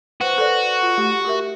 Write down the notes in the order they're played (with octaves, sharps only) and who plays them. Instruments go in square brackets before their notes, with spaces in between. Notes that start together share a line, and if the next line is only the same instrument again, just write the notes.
[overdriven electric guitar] F#4 [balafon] B4 C5
[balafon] A4 B4 D5
F4
A3 G4
G4 A#4 E5